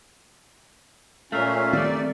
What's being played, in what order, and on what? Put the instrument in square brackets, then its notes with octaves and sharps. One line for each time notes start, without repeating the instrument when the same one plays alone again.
[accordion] A#2 C#4 [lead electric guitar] A3 A#4 [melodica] E5 F5
[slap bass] D#3 C4 [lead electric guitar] G3 A3 [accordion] D5